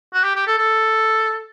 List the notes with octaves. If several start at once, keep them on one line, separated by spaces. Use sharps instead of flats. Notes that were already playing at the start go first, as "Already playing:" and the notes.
F#4
G4
G4
A4
A4